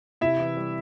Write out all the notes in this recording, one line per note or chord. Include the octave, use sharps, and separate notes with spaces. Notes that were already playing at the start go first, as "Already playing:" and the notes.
C3 E4 E5
E3
G3